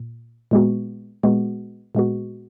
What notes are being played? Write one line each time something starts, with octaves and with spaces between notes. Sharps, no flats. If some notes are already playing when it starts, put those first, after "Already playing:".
Already playing: A#2
A#2 G#3 B3 F#4
A#2 G#3 B3 F#4
A#2 G#3 B3 F#4